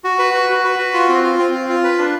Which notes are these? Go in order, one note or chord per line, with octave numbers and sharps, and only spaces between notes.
F#4
B4
F#4
F#4
B4
F#4
F4
C4
F4
C4
F4
F4
B4
D4